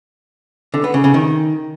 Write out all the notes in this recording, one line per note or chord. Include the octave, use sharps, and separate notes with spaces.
D3
B3
C#3
C#3
D#3